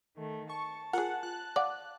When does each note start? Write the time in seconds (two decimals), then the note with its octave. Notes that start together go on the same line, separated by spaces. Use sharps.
0.16 D#3 A3
0.49 A5 C#6
0.93 F4 G#4 A#4 F#5
1.23 F4 F#6
1.56 D5 F5 F#5 D6